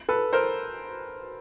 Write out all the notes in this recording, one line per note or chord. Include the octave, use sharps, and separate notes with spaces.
A4 B4
A#4 C5